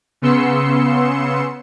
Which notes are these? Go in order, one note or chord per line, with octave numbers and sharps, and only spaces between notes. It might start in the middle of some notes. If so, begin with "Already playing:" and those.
C#3 B3 C6 E6 C#7